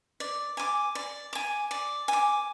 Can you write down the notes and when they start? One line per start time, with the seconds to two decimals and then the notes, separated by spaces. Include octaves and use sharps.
0.20 D5
0.57 G#5 D6
0.95 D5
1.33 G#5 D6
1.71 D5
2.08 G#5
2.13 D6